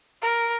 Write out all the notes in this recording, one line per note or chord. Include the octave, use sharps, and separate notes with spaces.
A#4